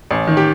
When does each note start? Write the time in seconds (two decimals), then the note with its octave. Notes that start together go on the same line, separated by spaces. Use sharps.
0.11 A1
0.27 D#3
0.37 G4